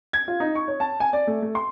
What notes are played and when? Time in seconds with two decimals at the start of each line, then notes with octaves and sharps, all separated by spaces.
0.13 G#6
0.28 F4
0.40 D#4
0.55 C#6
0.68 C#5
0.80 A5
1.00 G#5
1.13 D5
1.27 A3
1.42 A3
1.55 C6